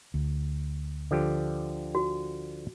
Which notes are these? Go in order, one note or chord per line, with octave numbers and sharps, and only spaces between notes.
D2
D3 F3 G4
F#4